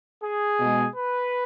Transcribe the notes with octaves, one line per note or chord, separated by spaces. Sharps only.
G#4
B2 G#3
B4